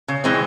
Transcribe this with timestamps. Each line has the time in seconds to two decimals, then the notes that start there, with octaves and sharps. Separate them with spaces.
0.08 C#3
0.24 E3 G#3 C4